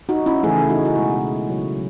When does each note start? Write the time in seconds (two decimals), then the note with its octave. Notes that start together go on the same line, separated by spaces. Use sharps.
0.09 D#4 F#4
0.26 C#4 E4
0.43 C#3 E3 A3 E4 G#4
0.70 D#4 F#4
0.85 F#4
0.95 B2 G#3 E4 G#4
1.49 C#3 F#3 A3